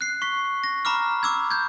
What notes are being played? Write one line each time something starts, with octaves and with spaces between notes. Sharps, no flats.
F#6 C7
C#6 B6
A#6
A#5 B5 D6 F6
D6 E6 G#6
G6 G#6